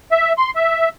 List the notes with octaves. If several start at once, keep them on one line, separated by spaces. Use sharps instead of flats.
E5
C6
E5